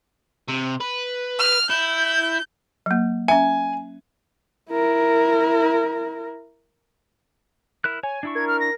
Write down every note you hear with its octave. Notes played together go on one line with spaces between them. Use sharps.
C3
B4
F6
E4 G6
F#3 A#3
C#4 E5 G#5
E4 A#4
E4 A#4 F#6
C#5 G#5
D4 E4 C#6
A#4 G#6
F6
A#6